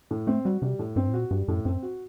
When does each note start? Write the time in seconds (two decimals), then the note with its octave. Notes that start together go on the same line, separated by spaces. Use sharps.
0.11 A2
0.27 A3 C4
0.45 G3 F#4
0.62 C3 G3
0.79 A2
0.96 G2 C4
1.08 A2
1.13 A#2 F#4
1.30 G2 G3
1.48 F#2 A2
1.65 F#2 C4
1.83 F#4